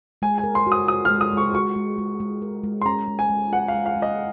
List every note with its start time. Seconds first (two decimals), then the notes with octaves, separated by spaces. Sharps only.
0.22 G#3 G#5
0.38 G#5
0.44 A#4
0.55 C6
0.67 F#4 D#6
0.88 F#4 D#6
1.05 F6
1.10 G#3
1.21 D#6
1.33 G#3 C#6
1.54 F#4 C#6
1.76 G#3
1.98 G#3
2.20 G#3
2.42 A#4
2.64 G#3
2.82 C6
2.86 C#4 A#5
3.08 G#3
3.19 G#5
3.30 G#3
3.52 F4 F#5
3.68 F5
3.74 G#3
3.86 F5
3.96 G#3
4.02 D#5